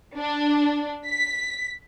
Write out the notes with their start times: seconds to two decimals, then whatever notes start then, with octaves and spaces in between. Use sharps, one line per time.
0.16 D4
1.07 B6